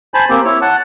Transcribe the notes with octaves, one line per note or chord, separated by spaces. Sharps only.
C5 G#5 A5 B5
A#3 C4 G4
E4 C#5
F#5 A5